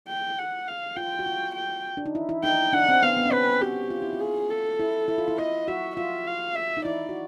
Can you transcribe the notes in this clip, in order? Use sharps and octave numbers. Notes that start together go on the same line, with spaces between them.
G5
F#5
F5
F4 G5
F#4
F4
G5
D4
D#4
E4
E4
D#4 G5
D4 F#5
C4
B3 F5
B3
C#4
C4 B4
F#4 G4
F4
E4
F4
G#4
A4
E4
E4
F4
E4
E4 D#5
F#4 E5
F4 E5
F5
E5
D#4
E4 D5
F#4